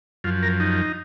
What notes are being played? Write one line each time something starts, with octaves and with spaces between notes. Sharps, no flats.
F#2 F3 F4
A#4
D#4